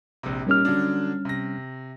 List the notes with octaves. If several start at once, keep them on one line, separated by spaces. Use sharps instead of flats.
A#1 C3
A#2 D#3 G3 C#4 G4 F6
D3 F#3 D4
C3 A#6